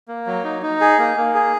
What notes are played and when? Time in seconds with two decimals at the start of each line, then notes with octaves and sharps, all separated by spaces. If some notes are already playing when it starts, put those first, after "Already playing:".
0.08 A#3
0.27 F#3
0.44 D#4
0.63 D#4
0.81 G#4
0.99 A#3
1.17 A#3
1.35 G#4